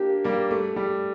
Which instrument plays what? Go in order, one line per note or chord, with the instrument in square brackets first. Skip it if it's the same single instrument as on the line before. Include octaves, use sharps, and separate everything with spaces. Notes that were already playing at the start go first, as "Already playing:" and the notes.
Already playing: [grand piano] A#3 D4 [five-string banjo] G4
[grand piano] G3 A#3
A3
G3